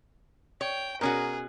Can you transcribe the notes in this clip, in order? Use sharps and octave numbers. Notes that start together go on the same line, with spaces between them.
C#5 G5
B2 C#4 F#4 G#4 A#4